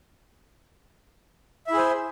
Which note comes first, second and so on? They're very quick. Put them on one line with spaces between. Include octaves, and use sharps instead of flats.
E5 E4 G#4 C5